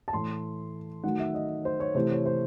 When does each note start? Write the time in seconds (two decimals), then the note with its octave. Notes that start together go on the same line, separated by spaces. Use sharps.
0.08 A5
0.13 A2 E3 A3 C6
1.04 D#3 F#3 A3 F#5
1.19 E5
1.34 D#5
1.65 C5
1.80 C#5
1.95 C3 E3 A3 C5
2.10 C#5
2.26 C5